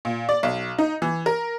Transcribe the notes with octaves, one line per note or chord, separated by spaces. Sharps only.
A#2
D5
B1
D#4
E3
A#4